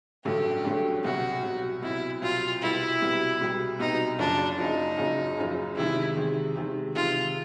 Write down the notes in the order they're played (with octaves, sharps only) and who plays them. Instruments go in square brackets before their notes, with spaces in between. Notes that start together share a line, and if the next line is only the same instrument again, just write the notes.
[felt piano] A1 G2 D3 F#3 A3 [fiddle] G4
[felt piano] A1 G2 D3 F#3 A3
[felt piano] C2 B2 F#3 [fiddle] F#4
[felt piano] C2 B2 F#3
[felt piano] C2 B2 F#3 [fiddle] E4
[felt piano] C2 B2 F#3 [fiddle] F4
[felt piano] C2 B2 G3 B3 [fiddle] E4
[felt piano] C2 B2 G3 B3
C2 B2 G3 B3
[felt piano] C2 B2 G3 B3 [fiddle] D#4
[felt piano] F#1 F#2 C#3 F3 [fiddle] D4
[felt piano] F#1 F#2 C#3 F3 [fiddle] D#4
[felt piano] F#1 F#2 C#3 F3
F#1 F#2 C#3 F3
[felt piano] E2 C3 D#3 G#3 [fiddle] E4
[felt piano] E2 C3 D#3 G#3
E2 C3 D#3 G#3
[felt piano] E2 C3 D#3 G#3 [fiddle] F4